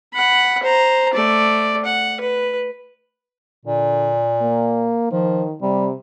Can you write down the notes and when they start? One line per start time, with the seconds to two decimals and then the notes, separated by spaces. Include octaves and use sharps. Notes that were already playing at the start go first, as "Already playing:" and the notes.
0.13 F#5 B5
0.63 C5 A#5
1.13 A3 D5
1.85 F#5
2.21 B4
3.65 A#2 D3
4.42 A#3
5.11 D#3 F3
5.62 C3 G3